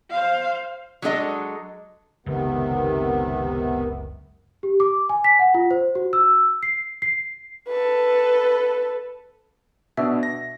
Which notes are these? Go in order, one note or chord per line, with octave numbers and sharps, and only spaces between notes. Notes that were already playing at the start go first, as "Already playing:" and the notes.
C5 F5
F#3 G#3 D4 A4 D#5
F#1 C#2 C3 D#3 B3
G4
D6
G#5
B6
F#5
F4
C5
F#4
E6
C7
C7
A4 B4
B2 D4 E5 E6
A#6